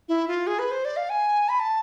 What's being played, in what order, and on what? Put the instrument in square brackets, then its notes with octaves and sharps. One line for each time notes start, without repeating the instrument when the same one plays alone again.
[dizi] E4
F4
G#4
B4
C5
D5
F5
G#5
B5
A5